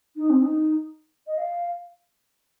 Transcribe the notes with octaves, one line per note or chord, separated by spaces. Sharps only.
D#4
C4
D#4
D#5
F5